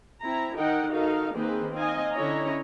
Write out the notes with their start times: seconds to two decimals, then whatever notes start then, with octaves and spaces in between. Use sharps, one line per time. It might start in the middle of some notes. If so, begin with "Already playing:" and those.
0.24 C4 E4 A#5
0.57 D#3 D#4 A#4 D#5 F#5 G5
0.90 D#4 F#4 A4 A#4 F5
1.35 D#3 A#3 C4 G#4 B4 C5
1.73 C4 D#4 D#5 F5 G#5
2.13 D3 C#4 E4 C#5 D#5 A#5